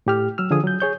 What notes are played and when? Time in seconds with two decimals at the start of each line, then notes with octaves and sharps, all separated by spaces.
0.06 A2 G4 F6
0.38 F#3 E6 F6
0.51 D3 F3 G#4 G#5 D#6
0.64 F#3 G6
0.80 G#4 C#5 G6